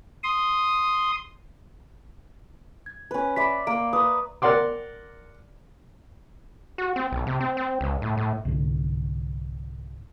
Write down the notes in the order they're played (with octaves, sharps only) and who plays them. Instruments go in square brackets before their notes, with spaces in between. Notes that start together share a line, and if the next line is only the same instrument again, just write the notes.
[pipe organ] C6 D#6
[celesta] G#6
[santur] C#4 B4
[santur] D5 E5 C6 [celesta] B5 B6
[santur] A#3 [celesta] D7
[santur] B4 C6 [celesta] D#6
[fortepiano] A#4 D5 F#5 C6 D6
[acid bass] F#4
C4
B1
C3
C4
C4
C#2
A2
A2
[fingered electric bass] C2 G#2 D3